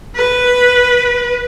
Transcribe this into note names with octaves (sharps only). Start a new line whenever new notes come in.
B4